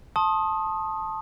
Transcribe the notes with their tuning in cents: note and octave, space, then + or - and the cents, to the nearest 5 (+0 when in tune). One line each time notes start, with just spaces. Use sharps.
A5 +0 C6 +40 D#6 +0